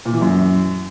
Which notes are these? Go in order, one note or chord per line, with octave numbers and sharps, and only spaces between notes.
A#2
E3
F#2